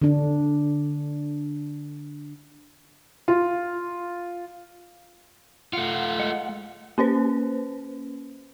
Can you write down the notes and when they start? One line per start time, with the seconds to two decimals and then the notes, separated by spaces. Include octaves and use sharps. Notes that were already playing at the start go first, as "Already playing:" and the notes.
0.02 D3 D4
3.28 F4
5.73 A3 F4 F#5
6.20 G#3 F#5
6.98 A#3 C#4 B4 C5